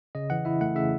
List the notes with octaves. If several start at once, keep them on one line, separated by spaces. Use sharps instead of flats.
C#3 D#5
E3 F#5
E4 E5
A3 F#5
C#3 E5